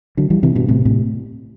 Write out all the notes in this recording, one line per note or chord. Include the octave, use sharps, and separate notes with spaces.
D3 F#3
E3 G3
C3 E3
G2 B2
A2 C3
A2 C3